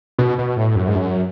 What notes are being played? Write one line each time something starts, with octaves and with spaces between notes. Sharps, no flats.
B2
B2
A2
F#2
G#2
F#2